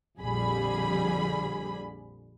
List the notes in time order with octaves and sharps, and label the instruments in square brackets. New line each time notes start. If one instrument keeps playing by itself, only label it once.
[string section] A#1 F2 D3 G3 G#4 B5